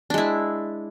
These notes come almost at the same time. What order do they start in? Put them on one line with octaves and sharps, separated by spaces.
D4 G#3 E4